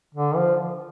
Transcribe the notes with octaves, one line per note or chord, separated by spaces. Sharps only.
D3
F3